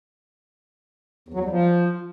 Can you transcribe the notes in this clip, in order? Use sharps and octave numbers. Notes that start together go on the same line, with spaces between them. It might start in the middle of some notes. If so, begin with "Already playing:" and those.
E2
F#3
E2
G3
F3